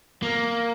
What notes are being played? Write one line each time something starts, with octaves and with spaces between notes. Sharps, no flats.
A#3